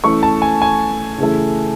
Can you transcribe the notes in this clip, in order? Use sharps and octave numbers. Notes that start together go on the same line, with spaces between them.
E3 A3 C#4 C#6
A5
G#5
G#5
C#3 E3 A3